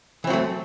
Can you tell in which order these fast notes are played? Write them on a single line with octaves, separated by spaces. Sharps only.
E3 C4 F#3 A3